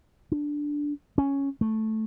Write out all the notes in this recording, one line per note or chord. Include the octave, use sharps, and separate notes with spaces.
D4
C#4
A3